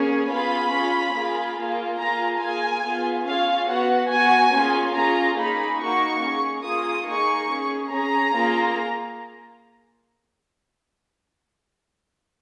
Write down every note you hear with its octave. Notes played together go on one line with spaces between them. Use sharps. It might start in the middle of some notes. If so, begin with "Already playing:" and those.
Already playing: A#3 C#4 G#4
B3 F4 G#4 B5
C#4 F4 G#4
A#3 F4 G#4
A#3 F4 G#4
A#3 F4 G#4 A#5
A#3 F4 G#4 G#5
B3 F4 G#4
C#4 F4 G#4 F5
B3 F#4 F#5
B3 F#4 G#5
A#3 C#4 F4 G#4
C#4 F4 G#4 A#5
A#3 D#4 G#4 B5
A#3 D#4 F#4 C#6
C#4 G#4
A#3 F4 G#4 D#6
A#3 D#4 G#4 C#6
C#4 G#4
C#4 G#4 A#5
A#3 F4 G#4